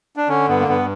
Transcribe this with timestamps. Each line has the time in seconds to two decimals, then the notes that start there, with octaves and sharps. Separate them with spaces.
0.16 D4
0.28 D3 C#4
0.48 G2 B3
0.60 A#3
0.68 G2 B3